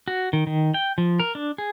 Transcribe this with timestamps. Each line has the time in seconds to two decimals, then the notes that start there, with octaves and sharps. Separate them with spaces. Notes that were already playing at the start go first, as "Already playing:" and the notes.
0.08 F#4
0.33 D#3
0.47 D#3
0.74 G5
0.98 F3
1.20 A#4
1.35 D4
1.58 G#4